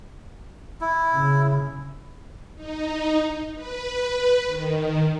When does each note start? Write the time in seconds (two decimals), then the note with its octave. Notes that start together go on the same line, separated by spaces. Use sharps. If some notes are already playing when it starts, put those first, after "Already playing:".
0.81 E4
1.14 C#3
2.56 D#4
3.55 B4
4.47 D#3